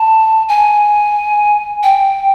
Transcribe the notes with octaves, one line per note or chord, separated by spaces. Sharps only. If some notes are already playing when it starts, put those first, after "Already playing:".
Already playing: A5
G#5
G5